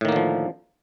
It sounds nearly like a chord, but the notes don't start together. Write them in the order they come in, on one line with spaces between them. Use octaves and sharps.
A2 D#3 A#3 D3 F3